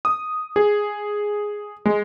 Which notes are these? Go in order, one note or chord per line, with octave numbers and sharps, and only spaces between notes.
D#6
G#4
G#3